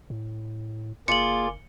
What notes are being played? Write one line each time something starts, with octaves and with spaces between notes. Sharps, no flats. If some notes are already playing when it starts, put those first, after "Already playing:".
A2
F#1 A#3 F4 G#4 D5 C#7 F#7